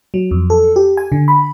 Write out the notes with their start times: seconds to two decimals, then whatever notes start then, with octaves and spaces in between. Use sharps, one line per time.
0.14 F#3
0.31 F2
0.50 A4
0.76 G4
0.97 G#5
1.12 D3
1.28 B5